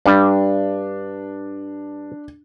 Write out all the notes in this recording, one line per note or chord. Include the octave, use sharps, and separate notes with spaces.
G2 G3 D4